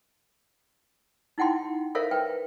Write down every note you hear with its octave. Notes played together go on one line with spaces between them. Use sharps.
D#4 E4 F#5 G5 C6
A4 A#4 C5 C#5 E5 F5
B4 G5